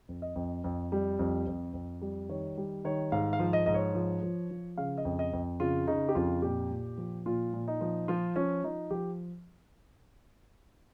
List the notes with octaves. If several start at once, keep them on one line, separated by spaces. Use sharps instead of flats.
F2
D#5
F2
F2
G3
F2
F2
F2
G3
D#3 C#5
G3
D#3 C#5
G#2 F5
F5
F3
D#5
G#2 D#5
C#5
F3
F3
F3
C#3 F5
D#5
F2
D#5
F2
C#3 F4
C#3 D#4
G4
F2 F4
A#2 G4
A#2
F3
A#2 F4
A#2
D#4
F3
F3 F4
F3 C#4
F3 D#4
F3 G4